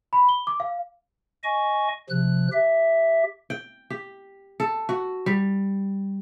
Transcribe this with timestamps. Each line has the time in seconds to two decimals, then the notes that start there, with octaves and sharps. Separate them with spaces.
0.13 B5
0.29 G7
0.47 D6
0.60 F5
1.44 D#5 G#5 C#6
2.10 C3 F3 F#6
2.52 G4 E5
3.50 G5
3.90 G4
4.60 A4
4.89 F#4
5.26 G3